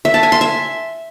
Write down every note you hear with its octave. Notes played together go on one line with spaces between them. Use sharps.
E5
A5
G#5
C6
E5